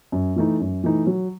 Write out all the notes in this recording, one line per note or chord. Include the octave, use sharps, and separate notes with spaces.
F#2
E3 A3 D#4
F#2
E3 A3 D#4
F#3